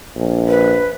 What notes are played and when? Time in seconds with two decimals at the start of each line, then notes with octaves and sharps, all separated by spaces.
0.16 A#1
0.47 B4